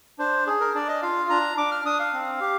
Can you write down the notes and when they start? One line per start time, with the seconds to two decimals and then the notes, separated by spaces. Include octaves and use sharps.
0.19 D4 C5
0.47 G#4
0.61 A#4
0.74 D4 D5
0.88 D#5
1.02 F4 F5
1.30 D4 A#5
1.57 D4 D6
1.72 F6
1.85 D4 D#6
2.00 F5
2.13 C4
2.40 G4